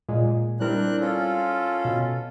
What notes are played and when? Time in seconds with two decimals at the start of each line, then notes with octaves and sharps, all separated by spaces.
0.09 A#2 G#3
0.60 G3 C4 D4 E4 A#4 F#6
1.01 C#4 F4 A4
1.85 B2